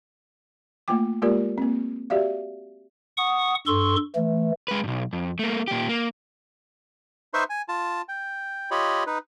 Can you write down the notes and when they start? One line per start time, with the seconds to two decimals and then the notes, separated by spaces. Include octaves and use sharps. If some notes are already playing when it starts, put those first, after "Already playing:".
0.88 A3 A#3 F4 G5 D6
1.22 G#3 A#3 F4 G4 A#4 D5
1.58 A#3 C4
2.10 F#4 G4 D5 E5 F5
3.18 F#5 C#6 D#6
3.67 G2 A4 C6 C#6
4.15 E3 A3
4.68 G#3 B4
4.84 B1 G2
5.13 F2
5.39 A3 A#3
5.68 A#2 G4
5.89 A#3
7.34 D#4 B4 C5 E5 C6 C#6
7.50 G#5
7.69 F4 A5
8.09 G5
8.71 F4 G4 C#5 D#5 B5
9.07 D#4 B4